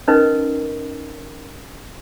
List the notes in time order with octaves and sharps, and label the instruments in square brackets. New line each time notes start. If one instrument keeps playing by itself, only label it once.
[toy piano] C#4 D#4 A#4 B4 D#5